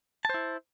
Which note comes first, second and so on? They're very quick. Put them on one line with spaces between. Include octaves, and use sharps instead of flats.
A5 C5 E4